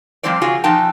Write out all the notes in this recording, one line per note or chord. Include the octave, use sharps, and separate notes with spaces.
F3 G3 C4 E4 C5 D5
C#3 F4 F#4 G#4
B2 E3 F3 D#4 G5 A5